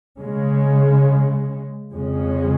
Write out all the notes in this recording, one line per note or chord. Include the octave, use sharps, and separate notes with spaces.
C#3 G#3 C#4
F2 C#3 G#3 C#4